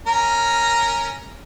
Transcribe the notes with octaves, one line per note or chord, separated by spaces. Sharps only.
C#4 A#4 A#5